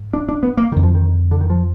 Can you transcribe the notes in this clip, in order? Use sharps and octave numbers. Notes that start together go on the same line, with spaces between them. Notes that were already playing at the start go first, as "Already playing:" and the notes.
Already playing: G#2
D4
D4
B3
A#3
F2 D3 D#3
F3
D#3
D3
D#3
F3